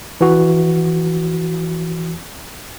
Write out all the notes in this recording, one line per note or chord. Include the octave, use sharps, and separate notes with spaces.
E3 F#4